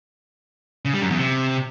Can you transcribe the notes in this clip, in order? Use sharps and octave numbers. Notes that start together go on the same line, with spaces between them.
C#3
G3
F#2
E2
C3